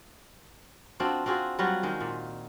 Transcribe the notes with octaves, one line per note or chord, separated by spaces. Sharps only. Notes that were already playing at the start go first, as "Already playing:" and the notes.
C4 D4 F4 F#4
C4 F4 F#4 G#4
F#3 G3 F4 F#4
D#3 G#3
A#2